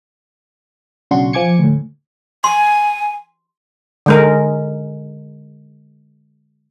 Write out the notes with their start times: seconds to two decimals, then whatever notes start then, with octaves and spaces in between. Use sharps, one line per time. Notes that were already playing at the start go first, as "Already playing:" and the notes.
1.11 B1 C#3 D4 F#4 C6 C#6
1.33 F3 G#5 D6 G#6 C#7
1.59 D2 A2
2.44 G#5 C6
4.06 D3 G#3 A#4